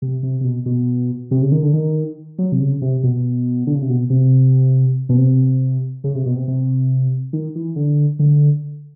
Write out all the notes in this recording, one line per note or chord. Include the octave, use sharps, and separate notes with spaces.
C3
C3
C3
B2
B2
C3
C#3
D#3
D3
D#3
F#3
C3
C#3
C3
B2
D3
C#3
C3
B2
C3
B2
C3
C#3
C3
B2
C3
C3
D#3
E3
D3
D3